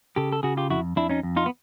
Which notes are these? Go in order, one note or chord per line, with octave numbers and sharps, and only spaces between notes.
C#3 G4 A4
A4
C#3 F#4 G#4
F4 G4
F2 E4 F#4
F2 D4 E4
C#4 D#4
F2
D#4 F4
B3